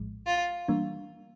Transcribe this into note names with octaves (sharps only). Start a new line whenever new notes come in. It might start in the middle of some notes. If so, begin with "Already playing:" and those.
Already playing: A#1 A2 F3 G#3
F4
E3 G3 A#3 D4